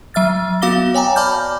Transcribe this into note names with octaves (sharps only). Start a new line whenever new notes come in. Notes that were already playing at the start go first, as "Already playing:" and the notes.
F#3 E5 F6 A6
B3 F#4 F5 D6 A#6 G7
C#5 G5 G#5 A#5
D5 A5 B5 D6 F6 G6